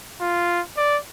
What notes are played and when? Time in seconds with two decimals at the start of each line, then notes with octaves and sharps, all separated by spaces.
0.21 F4
0.77 D5